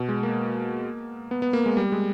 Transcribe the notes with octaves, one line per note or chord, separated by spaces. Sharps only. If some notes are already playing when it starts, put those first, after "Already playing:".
Already playing: B2
G#3
A#3
B3
B3
A#3
G#3
G3
G#3